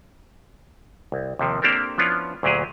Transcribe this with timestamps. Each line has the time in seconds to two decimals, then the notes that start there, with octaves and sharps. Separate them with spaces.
1.12 C2
1.39 D#2 C3 F3
1.62 A#3 C4 D4 G4 A4 A#4
1.98 F3 B3 C#4 D4 E4 F4
2.43 D2 A#2 F#3 G4 G#4